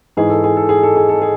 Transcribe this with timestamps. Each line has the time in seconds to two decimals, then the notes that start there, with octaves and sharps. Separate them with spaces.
0.17 G#2 E3 G#4
0.30 A4
0.44 G#4
0.57 A4
0.69 G#4
0.83 A4
0.96 G#4
1.09 A4
1.22 G#4